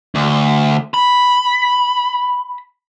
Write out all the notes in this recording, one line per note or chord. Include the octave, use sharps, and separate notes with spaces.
D2
B5